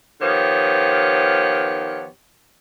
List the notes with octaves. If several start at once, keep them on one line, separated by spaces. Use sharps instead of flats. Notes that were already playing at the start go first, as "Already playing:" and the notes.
D#3 F3 B3 G4 C#5